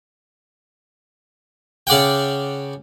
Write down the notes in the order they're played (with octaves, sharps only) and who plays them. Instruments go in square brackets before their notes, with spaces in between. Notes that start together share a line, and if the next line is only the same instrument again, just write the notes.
[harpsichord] C#3 D5 F#5 G5